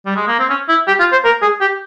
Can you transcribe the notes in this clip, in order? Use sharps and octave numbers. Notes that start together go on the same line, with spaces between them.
G3
G#3
A#3
C4
C#4
E4
G4
F4
C5
A#4
G#4
G4